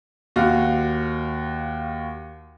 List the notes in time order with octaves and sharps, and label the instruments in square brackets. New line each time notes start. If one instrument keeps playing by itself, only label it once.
[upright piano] D#2 F#4 F5